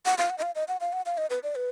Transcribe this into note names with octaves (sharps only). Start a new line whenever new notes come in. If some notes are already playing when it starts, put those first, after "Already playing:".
F#5
F5
F#5
D#5
F5
D#5
F#5
F5
F#5
F5
D#5
B4
D5
B4